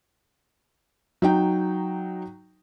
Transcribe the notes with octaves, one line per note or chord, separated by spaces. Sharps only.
F#3 D#4 G5